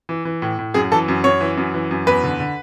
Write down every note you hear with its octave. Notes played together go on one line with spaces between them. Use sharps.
E3
E3
A2
A2
F#2 G#4
E3 A4
F#2
F#2 C#5
E3
F#2
E3
F#2
E2 B4
D3
D3